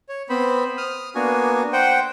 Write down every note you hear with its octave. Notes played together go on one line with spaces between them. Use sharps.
C#5
B3 C4 C5 B5
D#6 F6
A#3 B3 D4 F#4 G#5
C5 F#5 G5